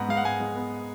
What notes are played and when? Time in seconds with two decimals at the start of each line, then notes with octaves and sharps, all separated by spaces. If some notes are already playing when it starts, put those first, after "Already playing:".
Already playing: G#2 B3 F#5 A#5
0.09 G#3 F5
0.17 F#5
0.24 G#2 F5 G#5
0.40 G#3
0.56 B3